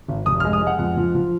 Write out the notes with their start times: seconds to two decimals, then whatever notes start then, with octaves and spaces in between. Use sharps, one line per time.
0.08 G#1
0.26 F1 D#6
0.40 F6
0.45 G#3
0.53 D#6
0.61 G#3
0.67 F#5
0.79 F2 F#5
0.97 F3
1.15 F3